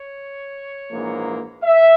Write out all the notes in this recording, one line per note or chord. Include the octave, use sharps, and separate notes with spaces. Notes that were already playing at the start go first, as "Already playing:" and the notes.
Already playing: C#5
A#1 G#2 E3 A#3
E5